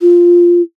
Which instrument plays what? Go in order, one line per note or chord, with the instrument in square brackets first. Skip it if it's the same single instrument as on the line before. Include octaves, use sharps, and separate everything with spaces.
[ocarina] F4